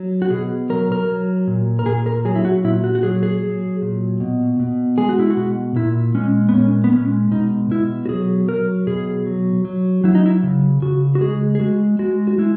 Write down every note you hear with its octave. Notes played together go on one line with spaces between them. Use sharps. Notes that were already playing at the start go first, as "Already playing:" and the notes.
Already playing: F#3
F#4
B2 G#4
F#3 A#4
A#4
F#3
A#2
A#4
A#2 G#4
A#4
F#3 G#4
E4
F#4
A#2 E4
F#4
F#4
F#3 G#4
G#4
F#3
A#2
B2
B2
G#3 G#4
F#4
E4
F#4
B2
A#2 E4
G#3 C#4
B3
A#2 C#4
B3
G#3 C#4
B2 D#4
B2 E4
F#4
F#3 G#4
F#3 A#4
B2 G#4
F#3
F#3
F#3 E4
D#4
E4
C#3
C#3 F#4
F#4
G#3 G#4
G#4
G#3 F#4
G#3 F#4
F#4
G#3 E4